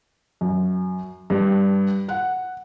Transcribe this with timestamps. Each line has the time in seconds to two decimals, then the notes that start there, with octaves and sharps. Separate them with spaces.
0.41 F#2
1.30 G2
2.09 F#5